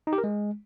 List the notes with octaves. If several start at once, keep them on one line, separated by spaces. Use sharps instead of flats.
D#4
G4
A#4
G#3